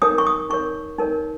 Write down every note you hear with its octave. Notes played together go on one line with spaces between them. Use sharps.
D#4 A#4 C#5 D#6
C#6
D#6
D#4 A#4 C#5 C#6
D#4 A#4 C#5